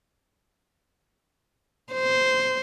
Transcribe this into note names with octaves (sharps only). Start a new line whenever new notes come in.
C5